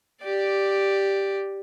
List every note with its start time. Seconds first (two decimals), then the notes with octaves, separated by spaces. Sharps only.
0.23 G4 D5